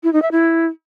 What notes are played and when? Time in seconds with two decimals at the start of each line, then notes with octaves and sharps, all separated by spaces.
0.03 E4
0.13 D#4
0.22 E5
0.31 E4